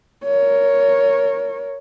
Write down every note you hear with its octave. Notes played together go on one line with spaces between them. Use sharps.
A#4 C#5